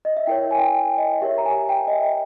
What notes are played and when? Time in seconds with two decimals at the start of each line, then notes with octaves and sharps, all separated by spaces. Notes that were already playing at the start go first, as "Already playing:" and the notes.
0.05 D#5
0.17 E5
0.27 E4 A#4 C#5 G5
0.51 G#5
0.58 G5
0.65 G#5
0.74 G5
0.98 D#5
1.22 G4 A#4 C#5 E5
1.38 A#5
1.45 G#5
1.69 G5
1.87 D#5
1.92 E5